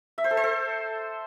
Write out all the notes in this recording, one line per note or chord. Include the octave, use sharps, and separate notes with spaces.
E5
C5
A4
C5
A4